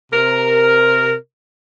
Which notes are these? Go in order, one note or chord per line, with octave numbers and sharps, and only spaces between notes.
C3 A#4